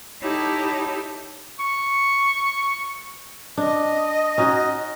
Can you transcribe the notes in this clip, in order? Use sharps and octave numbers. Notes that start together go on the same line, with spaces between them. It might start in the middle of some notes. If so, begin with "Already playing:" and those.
D#4 E4 G4 A4 C#5
C#6
D4 D#5
C#4 D#4 F#4